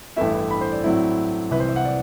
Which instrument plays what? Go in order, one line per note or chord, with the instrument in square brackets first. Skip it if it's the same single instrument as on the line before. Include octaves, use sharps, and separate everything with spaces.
[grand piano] A1 G2 E3 A3 E4 E5
B5
C5
D5
A2 F#3 C4 E4
C2 C3 E3 B4
C5
E5
F#5
D5